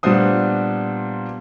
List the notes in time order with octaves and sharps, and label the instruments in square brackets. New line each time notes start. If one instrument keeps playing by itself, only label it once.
[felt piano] A#2 G3 B3 D4 C5 D#6